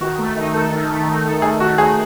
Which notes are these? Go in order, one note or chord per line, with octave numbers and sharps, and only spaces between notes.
D#3 F#4
A3
D#4
A4
D#3
A3
D#4
A4
D#3 G#4
A3 F#4
D#4 G#4